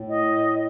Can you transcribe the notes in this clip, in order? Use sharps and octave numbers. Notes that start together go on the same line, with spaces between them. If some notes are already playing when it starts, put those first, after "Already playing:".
Already playing: A2
D#5